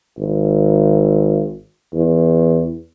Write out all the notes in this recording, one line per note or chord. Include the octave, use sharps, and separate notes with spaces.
G#1
E2